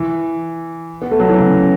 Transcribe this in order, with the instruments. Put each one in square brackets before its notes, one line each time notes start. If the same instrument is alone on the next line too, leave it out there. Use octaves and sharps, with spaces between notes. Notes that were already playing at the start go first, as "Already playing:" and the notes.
Already playing: [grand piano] E3
B3
A3
F#3
E3
C#3